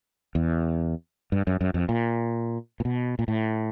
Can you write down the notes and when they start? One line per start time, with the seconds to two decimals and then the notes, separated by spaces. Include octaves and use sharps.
0.35 E2
1.32 G2
1.47 F#2
1.61 F#2
1.74 F2
1.89 A#2
2.80 A#2
2.85 B2
3.19 A#2
3.28 A2